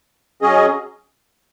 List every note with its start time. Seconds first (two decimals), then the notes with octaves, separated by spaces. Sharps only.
0.42 F#3 C#4 G#4 D#5